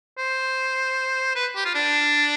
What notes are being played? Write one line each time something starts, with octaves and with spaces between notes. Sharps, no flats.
C5
B4
G4
F4
D4